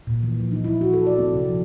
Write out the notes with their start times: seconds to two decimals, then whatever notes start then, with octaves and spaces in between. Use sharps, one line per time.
0.07 A#2
0.23 E3
0.40 F3
0.52 D#4
0.64 E4
0.81 F#4
0.93 A4
1.07 D5
1.18 C4
1.34 C3
1.49 F3